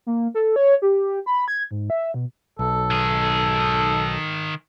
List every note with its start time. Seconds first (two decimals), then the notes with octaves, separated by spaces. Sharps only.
0.06 A#3
0.34 A4
0.56 C#5
0.82 G4
1.26 B5
1.48 G#6
1.71 G#2
1.90 E5
2.14 B2
2.59 B1 A4
2.91 D#3 G#4